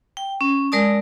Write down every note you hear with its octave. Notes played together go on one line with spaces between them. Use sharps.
G5
C#4
G#3 A#4 D5 A5 D#6